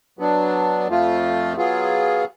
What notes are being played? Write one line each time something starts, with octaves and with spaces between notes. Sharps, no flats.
F#3 B3 D4
F2 F3 A3 F4
F#3 B3 F4 G#4